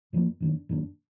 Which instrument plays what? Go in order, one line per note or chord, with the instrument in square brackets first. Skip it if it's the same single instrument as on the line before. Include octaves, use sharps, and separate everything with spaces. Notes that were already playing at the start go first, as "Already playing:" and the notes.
[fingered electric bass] F#2 F3 A#3
F#2 D#3 A#3 D4
F#2 D#3 A#3 D4